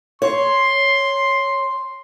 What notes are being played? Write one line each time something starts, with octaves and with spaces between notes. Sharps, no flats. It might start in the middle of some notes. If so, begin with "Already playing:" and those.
C#5 C6